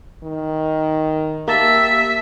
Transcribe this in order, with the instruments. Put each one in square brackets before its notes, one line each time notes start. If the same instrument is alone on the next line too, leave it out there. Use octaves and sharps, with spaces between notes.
[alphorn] D#3
[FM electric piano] A#3 A5 [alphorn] G4 [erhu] E5